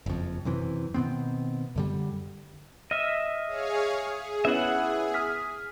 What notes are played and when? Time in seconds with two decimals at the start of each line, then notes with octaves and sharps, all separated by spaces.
0.06 F#1 F2
0.45 F#2 C3 E3
0.94 B2 D#3 B3 C4
1.76 F#2 D3 G3
2.91 D#5 E5 E6 F6
3.46 G#4 C#5 F5
4.09 G#4
4.45 B3 C#4 E4 E5 F#5
5.14 D#6 F6 B6